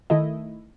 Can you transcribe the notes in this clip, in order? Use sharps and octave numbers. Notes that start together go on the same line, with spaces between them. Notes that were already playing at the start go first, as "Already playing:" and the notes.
D#3 A3 E4 D#5